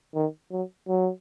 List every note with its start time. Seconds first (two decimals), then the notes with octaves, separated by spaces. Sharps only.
0.15 D#3
0.51 F#3
0.88 F#3